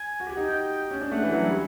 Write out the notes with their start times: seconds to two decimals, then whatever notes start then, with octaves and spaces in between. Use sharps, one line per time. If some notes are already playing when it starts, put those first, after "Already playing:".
Already playing: G#5
0.20 F#4
0.27 G4
0.37 D#4
0.48 G5
0.91 C#4
1.01 D4
1.11 A3 F#5
1.23 E3
1.33 F#3
1.44 G3